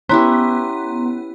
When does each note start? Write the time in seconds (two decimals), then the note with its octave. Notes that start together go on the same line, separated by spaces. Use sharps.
0.09 B3 C#4 E4 G4 A#5 C6